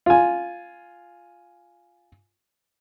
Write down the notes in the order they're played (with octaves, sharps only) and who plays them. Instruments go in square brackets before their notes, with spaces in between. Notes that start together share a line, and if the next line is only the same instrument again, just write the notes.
[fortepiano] F4 G#5